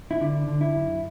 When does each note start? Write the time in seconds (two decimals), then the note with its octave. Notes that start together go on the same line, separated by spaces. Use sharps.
0.11 E4
0.20 D3 D4
0.47 D3
0.61 E4
0.75 F#2